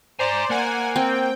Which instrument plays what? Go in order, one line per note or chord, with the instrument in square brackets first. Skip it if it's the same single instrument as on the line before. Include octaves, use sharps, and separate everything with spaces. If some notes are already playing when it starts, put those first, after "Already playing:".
[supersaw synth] C5 D5 [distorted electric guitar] G#5 A#5
[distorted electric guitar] A#3 [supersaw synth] F#5 G#5
[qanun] C4 [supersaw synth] G5